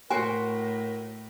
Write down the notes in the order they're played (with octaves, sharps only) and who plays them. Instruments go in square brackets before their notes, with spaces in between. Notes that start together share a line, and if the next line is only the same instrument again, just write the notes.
[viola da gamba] A2 [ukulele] F#4 C5 [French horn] A#4 [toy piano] G#5